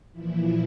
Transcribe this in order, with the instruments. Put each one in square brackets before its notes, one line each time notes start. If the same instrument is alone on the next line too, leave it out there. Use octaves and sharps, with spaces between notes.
[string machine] A#2 E3 F3 E4